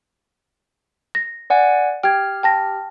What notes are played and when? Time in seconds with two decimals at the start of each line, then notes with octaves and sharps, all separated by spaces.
1.15 A#6
1.50 D5 F#5 G#5
2.03 G4 G5 F6 G#6
2.43 G5 A5 A#6